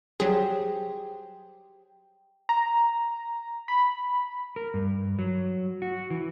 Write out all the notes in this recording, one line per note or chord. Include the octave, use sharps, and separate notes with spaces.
F#3 G3 G4 G#4 C5
A#5
B5
A#4
G2
F#3
F#4
E3